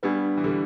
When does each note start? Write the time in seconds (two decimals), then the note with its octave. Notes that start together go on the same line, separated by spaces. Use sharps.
0.03 G3 B3 D4 G4 B4
0.37 E3
0.44 D3 G3